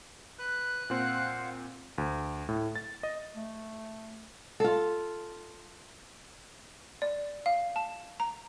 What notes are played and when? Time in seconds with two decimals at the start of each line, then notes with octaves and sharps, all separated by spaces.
0.39 B4 F#6
0.90 A#2 C4 C5 F5 F#5
1.98 D2
2.49 A2
2.75 A6
3.03 D#5
3.36 A3
4.60 F4 A4
7.02 D5
7.46 F5
7.76 A5
8.20 A#5